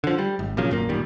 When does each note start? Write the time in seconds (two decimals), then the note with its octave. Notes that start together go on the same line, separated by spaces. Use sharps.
0.04 D3 F3
0.18 G3
0.39 G#1
0.57 A#2 C#3 F3 F#3
0.70 G#1 F#2 A#2 A#3
0.89 D1 A#2 D#3 G3